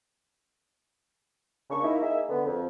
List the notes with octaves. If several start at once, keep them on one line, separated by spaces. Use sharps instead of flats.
C#3 A#3 D4 G#4 C#6
A#3 D#4 E4
A#3 D#4 G#4 E5
D3 B3
F2